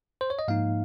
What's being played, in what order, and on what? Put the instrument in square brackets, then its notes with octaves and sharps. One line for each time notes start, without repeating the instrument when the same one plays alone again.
[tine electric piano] C5
C#5
D#5
G#2 F3 A#3 D#4 F5